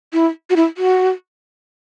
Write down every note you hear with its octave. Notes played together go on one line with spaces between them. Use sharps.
E4
F#4
E4
F#4